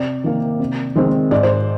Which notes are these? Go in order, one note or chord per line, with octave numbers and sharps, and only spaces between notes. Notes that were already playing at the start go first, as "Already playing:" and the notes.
Already playing: C3 D5
D#3 A#3
C3
D#3 G#3 C4
G#2 D5
C5